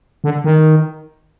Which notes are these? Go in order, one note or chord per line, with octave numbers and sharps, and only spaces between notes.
D3
D#3